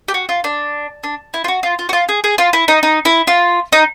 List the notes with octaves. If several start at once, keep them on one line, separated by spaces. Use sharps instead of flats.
G4
F#4
F4
D4
D4
E4
F4
F#4
F4
F4
F#4
F4
G#4
G#4
F4
E4
D#4
D#4
E4
F4
D#4